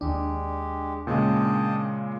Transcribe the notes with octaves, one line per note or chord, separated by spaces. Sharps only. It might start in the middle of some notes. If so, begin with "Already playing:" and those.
D#2 G#3 D4 G4
A#2 C#3 G#3 D#5 G5 A5